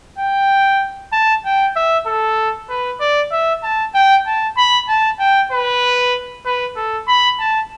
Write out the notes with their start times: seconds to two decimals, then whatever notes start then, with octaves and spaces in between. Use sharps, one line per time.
0.19 G5
1.13 A5
1.45 G5
1.76 E5
2.06 A4
2.69 B4
3.00 D5
3.32 E5
3.63 A5
3.94 G5
4.26 A5
4.57 B5
4.88 A5
5.19 G5
5.52 B4
6.45 B4
6.76 A4
7.08 B5
7.39 A5